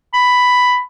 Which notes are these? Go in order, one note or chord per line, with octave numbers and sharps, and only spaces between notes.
B5